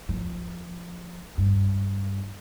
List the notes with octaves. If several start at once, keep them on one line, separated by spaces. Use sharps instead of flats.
F3
G2